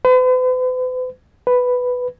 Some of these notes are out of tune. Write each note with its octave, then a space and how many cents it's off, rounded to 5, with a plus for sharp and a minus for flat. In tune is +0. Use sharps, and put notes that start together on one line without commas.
B4 +45
B4 +5